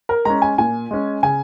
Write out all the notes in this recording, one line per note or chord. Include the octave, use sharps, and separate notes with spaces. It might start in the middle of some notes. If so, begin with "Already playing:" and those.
A#4
G#3 C#4 A#5
G#5
A#2 G#5
G#3 C#4
C#3 G#5